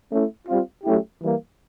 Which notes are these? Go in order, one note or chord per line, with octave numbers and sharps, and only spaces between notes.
A3 C#4 E4
G3 C4 F4
F#3 A3 C#4 E4 G4
E3 G3 A#3